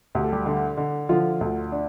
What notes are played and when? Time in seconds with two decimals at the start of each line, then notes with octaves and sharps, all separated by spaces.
0.15 D2 G4
0.24 A4
0.32 G3 G4
0.46 D3
0.77 D3
1.09 D3 F3 F4
1.41 D2
1.72 D4